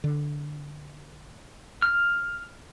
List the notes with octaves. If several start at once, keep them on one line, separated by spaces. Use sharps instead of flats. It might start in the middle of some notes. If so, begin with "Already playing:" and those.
D3
F6